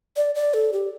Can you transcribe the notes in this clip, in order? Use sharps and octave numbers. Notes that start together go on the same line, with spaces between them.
D5
D5
A4
G4